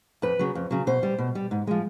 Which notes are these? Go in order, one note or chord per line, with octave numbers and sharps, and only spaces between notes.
F2 B4
C#3 F#3
F2
C#3 F#3
B2 C5
G3
B2
G3
G#2
F3 G#3